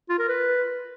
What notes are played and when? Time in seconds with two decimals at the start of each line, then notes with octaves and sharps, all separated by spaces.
0.10 F4
0.19 A#4
0.28 B4